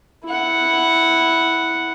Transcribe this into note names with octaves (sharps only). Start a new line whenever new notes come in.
E4 F#5